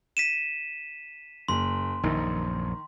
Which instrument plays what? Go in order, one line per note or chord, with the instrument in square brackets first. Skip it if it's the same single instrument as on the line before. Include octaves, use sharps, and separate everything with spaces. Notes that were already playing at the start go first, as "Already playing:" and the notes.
[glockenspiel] B6 D#7 E7
[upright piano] F#1 [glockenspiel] C6
[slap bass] A#1 F#2 [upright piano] D#3